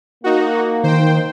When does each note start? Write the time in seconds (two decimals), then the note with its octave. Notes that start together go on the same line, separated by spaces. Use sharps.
0.24 A#3 D#4 F#4
0.84 D#3 C5 G5